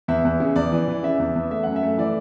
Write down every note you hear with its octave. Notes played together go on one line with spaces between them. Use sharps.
E2 E5
E2
C#3
E2 D5
E3
E3
C#3 E5
E2
E2
A3 E5
F#2 F#5
E5
A3
E3 D5